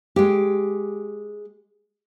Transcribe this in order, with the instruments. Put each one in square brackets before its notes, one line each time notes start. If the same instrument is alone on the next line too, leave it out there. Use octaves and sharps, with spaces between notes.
[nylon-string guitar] G#3 G4